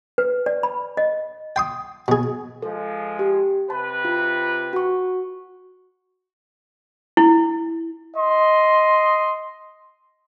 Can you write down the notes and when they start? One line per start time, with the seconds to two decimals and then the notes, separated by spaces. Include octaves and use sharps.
0.18 B4
0.46 D5
0.63 B5
0.97 D#5
1.56 G5 C6 D#6
2.08 B2 G#4
2.62 F3 G#3 A4
3.19 G4
3.70 C3 B4 A5
4.05 F4
4.73 F#4 C#6
7.17 E4
8.17 D#5 C6